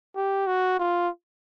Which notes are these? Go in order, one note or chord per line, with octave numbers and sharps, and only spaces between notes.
G4
F#4
F4